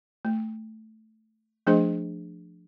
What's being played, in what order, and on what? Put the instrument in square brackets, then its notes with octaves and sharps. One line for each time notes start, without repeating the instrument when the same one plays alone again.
[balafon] A3
F3 A3 D4 G#4 C5 D#5